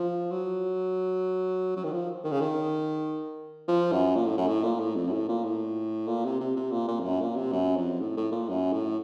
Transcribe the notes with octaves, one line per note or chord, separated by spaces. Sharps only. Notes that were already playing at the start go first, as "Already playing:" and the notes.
Already playing: F3
F#3
F#3
D#3
F3
D#3
C#3
D#3
F3
F#2
A#2
A2
F#2
A2
A#2
A2
F2
F#2
A2
A#2
A2
A#2
C3
C3
C3
A#2
A#2
F2
F#2
A#2
C3
F#2
F2
A2
A2
A#2
F#2
A2